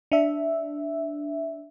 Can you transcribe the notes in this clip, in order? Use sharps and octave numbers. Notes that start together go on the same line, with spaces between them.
D4 E5